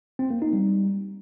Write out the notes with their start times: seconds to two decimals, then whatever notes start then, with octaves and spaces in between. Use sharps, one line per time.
0.19 C4
0.30 A#3
0.42 D#4
0.53 G3